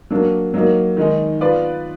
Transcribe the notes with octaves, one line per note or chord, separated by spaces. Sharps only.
F#3 A#3 D4
F#3 A#3 D#4
D#3 G#3 D#4
B3 F4 B4 D5